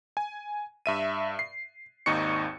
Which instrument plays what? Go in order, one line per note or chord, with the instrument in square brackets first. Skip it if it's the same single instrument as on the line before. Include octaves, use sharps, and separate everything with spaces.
[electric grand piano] G#5
G2 E5 D#7
C7
G#1 D#2 D#4 C#6 C#7